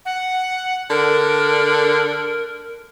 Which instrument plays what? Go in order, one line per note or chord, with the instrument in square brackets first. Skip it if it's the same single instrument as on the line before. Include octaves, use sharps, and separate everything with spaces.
[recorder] F#5
[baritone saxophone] D3 [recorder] A#4